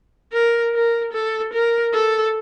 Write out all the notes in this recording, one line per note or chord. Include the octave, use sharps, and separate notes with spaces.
A#4
A#4
A4
A#4
A4